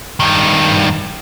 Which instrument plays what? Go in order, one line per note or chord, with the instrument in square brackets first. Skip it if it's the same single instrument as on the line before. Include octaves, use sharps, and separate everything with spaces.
[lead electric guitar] G2 D#3